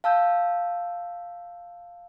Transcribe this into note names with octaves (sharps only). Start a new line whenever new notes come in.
F5 A5 E6 G6